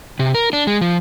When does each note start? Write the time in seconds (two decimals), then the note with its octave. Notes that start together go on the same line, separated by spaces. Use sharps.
0.19 C3
0.35 A#4
0.53 D4
0.67 G#3
0.81 F3